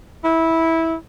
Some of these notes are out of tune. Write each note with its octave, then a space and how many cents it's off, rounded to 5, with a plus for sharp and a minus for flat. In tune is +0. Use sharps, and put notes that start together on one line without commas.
E4 -15